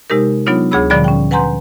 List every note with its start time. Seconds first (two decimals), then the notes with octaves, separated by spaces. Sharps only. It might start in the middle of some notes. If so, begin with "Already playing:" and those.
0.10 C3 G#3 D#4 G4 A#4
0.46 F#3 B3 D4 D#4 F4 C#5
0.71 D2 D4 G#4 C#5 B5 E6
0.90 A#2 D3 F3 G3 D5 B5
1.04 C#4 G5
1.31 B4 F#5 G#5 A#5 C6 G6